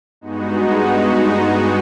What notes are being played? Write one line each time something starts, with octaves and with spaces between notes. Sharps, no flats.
G2 G#3 B3 D#4 F#4